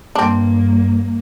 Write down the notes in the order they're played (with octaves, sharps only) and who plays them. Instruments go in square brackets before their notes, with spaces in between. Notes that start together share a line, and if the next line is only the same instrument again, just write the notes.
[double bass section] G2 [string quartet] A#3 [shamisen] C4 D4